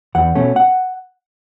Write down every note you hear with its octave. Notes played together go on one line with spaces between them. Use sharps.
E2 F#5
B2 A3 C#4
F#5